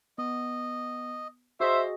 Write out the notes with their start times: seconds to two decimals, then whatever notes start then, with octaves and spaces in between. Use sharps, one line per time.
0.18 B3 D#5
1.60 F#4 G#4 C5 D#5 E5